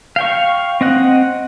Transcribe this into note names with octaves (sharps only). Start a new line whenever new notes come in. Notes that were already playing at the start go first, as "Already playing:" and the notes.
F5 G5 C#6
C4 D#5 F#5